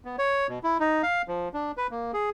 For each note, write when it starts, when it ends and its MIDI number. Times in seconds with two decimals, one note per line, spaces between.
0.05 0.16 59
0.18 0.47 73
0.49 0.59 47
0.63 0.78 64
0.80 1.02 63
1.03 1.22 77
1.28 1.48 53
1.54 1.72 62
1.77 1.87 71
1.91 2.12 58
2.14 2.30 68